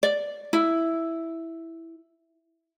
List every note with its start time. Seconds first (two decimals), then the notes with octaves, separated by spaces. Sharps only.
0.03 D5
0.53 E4